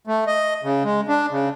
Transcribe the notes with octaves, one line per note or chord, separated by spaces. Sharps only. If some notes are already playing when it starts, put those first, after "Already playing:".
A3
D#5
C#3
G#3
D4
C#3